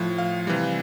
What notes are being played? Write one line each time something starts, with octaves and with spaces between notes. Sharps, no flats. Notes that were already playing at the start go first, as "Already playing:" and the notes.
Already playing: A2 F3
F5
C3 E3 G3